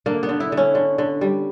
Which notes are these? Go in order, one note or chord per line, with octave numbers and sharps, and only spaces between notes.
D3 A#3
B3
D3
E4
D3
C#4
D3
D3
G3